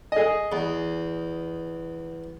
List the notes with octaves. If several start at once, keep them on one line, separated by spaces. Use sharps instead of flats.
G#4 D#5
E2